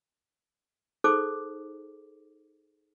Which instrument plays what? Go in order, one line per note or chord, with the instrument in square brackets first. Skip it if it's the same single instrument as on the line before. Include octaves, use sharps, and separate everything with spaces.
[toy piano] D#4 G#4 A4 C5 D6